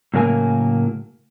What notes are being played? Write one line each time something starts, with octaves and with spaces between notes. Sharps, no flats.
A2 C#3 F#3 A#3 A#4 G#5